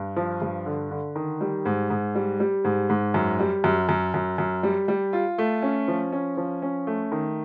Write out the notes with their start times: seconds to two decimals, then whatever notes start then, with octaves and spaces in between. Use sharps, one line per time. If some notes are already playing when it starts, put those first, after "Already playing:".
Already playing: G2
0.16 F3
0.42 G2
0.66 D3
0.91 D3
1.16 D#3
1.41 G3
1.65 G#2
1.90 G#2
2.15 G3
2.40 G3
2.65 G#2
2.89 G#2
3.14 F#2
3.39 G3
3.64 F#2
3.89 F#2
4.14 F#2
4.38 F#2
4.63 G3
4.88 G3
5.13 F4
5.38 A3
5.62 C#4
5.88 F3
6.12 C#4
6.37 F3
6.62 C#4
6.87 A3
7.12 D#3